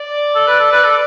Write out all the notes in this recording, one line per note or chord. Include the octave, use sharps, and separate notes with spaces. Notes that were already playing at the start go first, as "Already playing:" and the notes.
Already playing: D5
A4
B4
A4
B4
A4